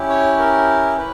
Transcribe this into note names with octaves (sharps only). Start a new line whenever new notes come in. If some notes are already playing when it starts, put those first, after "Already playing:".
Already playing: C#4 E4 G4
C#5
A#4
B4